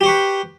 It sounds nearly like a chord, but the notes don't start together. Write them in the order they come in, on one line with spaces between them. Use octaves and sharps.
G4 C5 C#6 B4